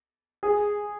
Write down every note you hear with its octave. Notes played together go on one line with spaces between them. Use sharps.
G#4